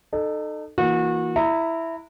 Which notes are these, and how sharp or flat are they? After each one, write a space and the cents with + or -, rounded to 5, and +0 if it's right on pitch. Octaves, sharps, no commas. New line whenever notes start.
D#4 -30 A4 +0
E3 +0 A#3 +5 F#4 -30
E4 +0 A#5 -25